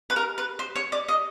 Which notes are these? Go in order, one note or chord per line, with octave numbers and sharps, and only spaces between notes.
B4
A#4
B4
C5
C#5
D5
D#5